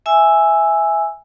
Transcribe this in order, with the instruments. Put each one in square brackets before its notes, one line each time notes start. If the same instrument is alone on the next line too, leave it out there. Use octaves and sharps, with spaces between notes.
[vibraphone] E5 G#5 E6